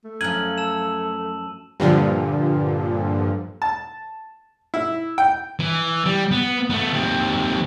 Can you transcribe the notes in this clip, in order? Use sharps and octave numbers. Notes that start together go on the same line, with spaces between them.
A3
F#2 F3 G#6 D#7 F#7
A5 E6 E7
G2 A#2 D3 F3
A5
E4
G5
E3
G3
B3
A3 B3
D#2 C4